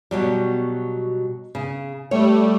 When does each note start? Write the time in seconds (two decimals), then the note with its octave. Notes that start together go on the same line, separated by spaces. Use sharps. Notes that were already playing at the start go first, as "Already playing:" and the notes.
0.11 B2 F#3 G3
1.55 C#3
2.11 G3 A3 C#5